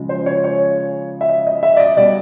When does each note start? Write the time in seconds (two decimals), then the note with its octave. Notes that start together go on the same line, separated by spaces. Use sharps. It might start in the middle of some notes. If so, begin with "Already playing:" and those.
Already playing: C#3 F3 G#3
0.09 C5
0.26 C#5
0.44 C#5
1.21 E5
1.29 D#5
1.47 D#5
1.63 E5
1.77 D5
1.80 D#5
1.97 B2 G3 D5